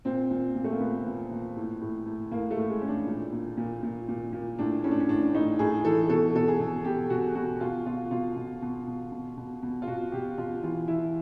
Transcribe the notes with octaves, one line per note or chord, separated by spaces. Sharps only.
A#2 C4
A#2
A#2
A3
A#3
A#2 B3
A#2
A#2
A2
A2
A2
A2 A#3
A3
A2
G#3
A2 C#4
D4
A#2
A#2
A#2
A#2
A#2
A#2
A2 D4
A2 C#4
D4
C#4
A2 D4
A2 D#4
A2 G#4
E3 A4
B2 A4
B2 A4
G#4
B2
B2 G4
B2 F#4
B2 F#4
B2 F4
B2 F4
B2 F4
B2
B2
B2
B2
B2
B2
F4
B2 F#4
B2 G4
B2 F4
E3 F4
E3 E4